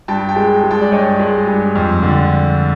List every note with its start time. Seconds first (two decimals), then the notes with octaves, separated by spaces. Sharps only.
0.08 G2 G5 A5
0.29 G5 A5
0.36 G#3
0.64 G#3
0.71 G5 A5
0.81 D5
0.92 G2 C#5 D#5
1.19 G#3
1.47 G2
1.75 F2
2.03 D3